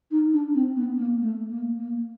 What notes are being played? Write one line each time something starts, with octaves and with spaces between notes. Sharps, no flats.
D#4
D4
C4
B3
A#3
A3
A#3
A#3